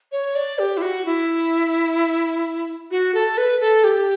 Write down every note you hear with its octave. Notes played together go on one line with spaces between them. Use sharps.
C#5
D5
G4
E4
F#4
E4
F#4
A4
B4
A4
G4